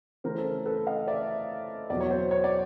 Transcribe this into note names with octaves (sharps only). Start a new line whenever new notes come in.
C#3 E3 A3 A#4 C5
A4
A#4
A4 B4
D#5 F5
D5 E5
E2 B2 F#3 D5
C#5
C5 D5
C#5
D5